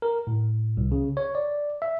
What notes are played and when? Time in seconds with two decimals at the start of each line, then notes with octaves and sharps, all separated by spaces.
0.02 A#4
0.27 A2
0.77 C2
0.92 C#3
1.17 C#5
1.35 D5
1.82 E5